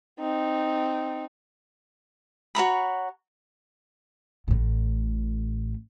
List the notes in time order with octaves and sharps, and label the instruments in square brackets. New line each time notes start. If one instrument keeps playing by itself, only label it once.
[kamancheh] C4 D#4
[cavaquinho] F#4 C#5 A#5 B5
[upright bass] A1 A2